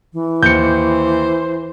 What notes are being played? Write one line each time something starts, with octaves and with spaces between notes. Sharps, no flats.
E3
D#2 C5 G6 C#7